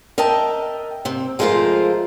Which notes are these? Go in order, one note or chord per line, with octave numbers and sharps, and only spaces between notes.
A#4 D#5 E5 G5 A5
C3 C4
F3 G#3 A3 F4 A#4 C5